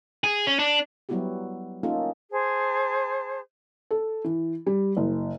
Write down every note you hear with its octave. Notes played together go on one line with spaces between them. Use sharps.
G#4
C#4
D4
F#3 G3 B3 E4 F#4 G4
A#3 C#4 D#4 F4 A4
G#4 C5 A5
A4
E3
G3
F#1